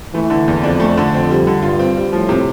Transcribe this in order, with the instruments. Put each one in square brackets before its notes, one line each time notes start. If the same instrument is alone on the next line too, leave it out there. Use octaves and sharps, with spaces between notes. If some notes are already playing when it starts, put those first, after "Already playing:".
[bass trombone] E3 [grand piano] A3
[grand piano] D3
E2
[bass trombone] F2 [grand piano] D4
[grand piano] A3
D3
[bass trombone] F2 [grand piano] C4
[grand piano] G3
D3
[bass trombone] G2 [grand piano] F4
[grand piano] C4
G3
[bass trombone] A2 [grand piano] F3
[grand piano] C3